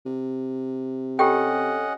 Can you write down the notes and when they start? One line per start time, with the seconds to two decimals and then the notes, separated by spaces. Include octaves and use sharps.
0.06 C3
1.19 C#4 F4 G4 A4 D#5 F#5 G5